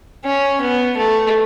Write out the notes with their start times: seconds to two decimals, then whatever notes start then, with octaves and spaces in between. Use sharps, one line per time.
0.25 C#4
0.61 B3
0.97 A3